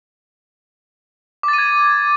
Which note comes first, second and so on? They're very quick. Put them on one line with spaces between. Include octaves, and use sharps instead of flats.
D6 A6 D#7 G#6